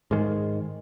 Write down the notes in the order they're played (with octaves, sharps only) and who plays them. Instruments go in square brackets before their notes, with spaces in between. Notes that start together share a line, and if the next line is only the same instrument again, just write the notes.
[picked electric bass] G#2 D#3 G#3